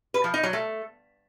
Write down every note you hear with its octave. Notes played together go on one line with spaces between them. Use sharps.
B4
F3
D#4
F#3
A3